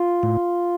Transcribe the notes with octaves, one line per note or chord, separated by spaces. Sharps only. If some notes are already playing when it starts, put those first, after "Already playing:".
Already playing: F4
A2